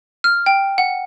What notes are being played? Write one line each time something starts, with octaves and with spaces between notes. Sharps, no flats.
F6
G5
F#5